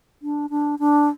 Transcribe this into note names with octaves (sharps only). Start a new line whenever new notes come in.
D4
D4
D4